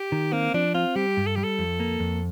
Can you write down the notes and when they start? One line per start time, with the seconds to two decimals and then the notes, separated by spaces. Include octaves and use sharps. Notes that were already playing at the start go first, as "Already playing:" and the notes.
Already playing: G4
0.12 D#3
0.33 A#3 C4
0.54 F3 D4
0.74 C4 F4
0.96 G3 G4
1.17 G2
1.27 A4
1.35 G3 G4
1.44 A4
1.59 F2
1.80 A#3
2.00 F2